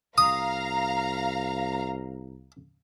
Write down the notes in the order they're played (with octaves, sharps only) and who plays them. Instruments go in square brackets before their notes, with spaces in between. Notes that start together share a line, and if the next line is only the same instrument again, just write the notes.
[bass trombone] C2 [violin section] F5 A#5 [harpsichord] D#6